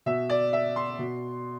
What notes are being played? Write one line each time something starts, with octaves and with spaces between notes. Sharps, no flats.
B2 E5
D5
E5
C6
B2